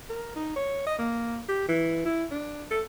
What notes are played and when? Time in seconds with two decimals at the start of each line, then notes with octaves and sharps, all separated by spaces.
0.09 A#4
0.36 D#4
0.56 C#5
0.87 D#5
0.98 A#3
1.49 G4
1.68 E3
2.05 E4
2.31 D4
2.71 A4